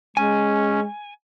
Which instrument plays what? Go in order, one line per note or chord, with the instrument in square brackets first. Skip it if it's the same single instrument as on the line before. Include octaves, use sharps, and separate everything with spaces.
[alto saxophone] G#3 [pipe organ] C#4 [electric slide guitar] G#5